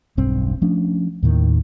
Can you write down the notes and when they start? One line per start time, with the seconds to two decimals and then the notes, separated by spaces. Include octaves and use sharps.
0.17 E1 B1 G2 C4
0.62 F3 A3 C#4 D4
1.23 D#2 A2 D#3